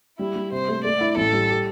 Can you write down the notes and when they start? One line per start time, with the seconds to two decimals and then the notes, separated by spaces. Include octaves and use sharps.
0.19 G3 E4
0.36 G3
0.52 C3 C5
0.69 A3
0.84 A3 D5
1.01 E4
1.17 A1 A4
1.33 G3
1.49 G4